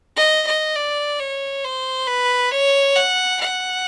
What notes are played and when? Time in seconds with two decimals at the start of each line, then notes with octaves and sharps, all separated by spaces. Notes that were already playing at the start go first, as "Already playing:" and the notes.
0.16 D#5
0.46 D#5
0.76 D5
1.19 C#5
1.64 C5
2.07 B4
2.51 C#5
2.96 F#5
3.40 F#5